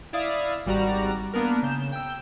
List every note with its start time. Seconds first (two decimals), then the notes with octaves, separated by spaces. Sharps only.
0.13 E4 D5 E5 F5 D#6
0.66 G#1 G3 F#4 D5 A#5
1.33 A#3 B3 D4 A#4
1.63 C#3 G6 E7
1.92 G5 E6